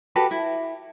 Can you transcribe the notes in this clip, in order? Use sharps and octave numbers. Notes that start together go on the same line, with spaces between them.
F#4 G4 A4 B4
E4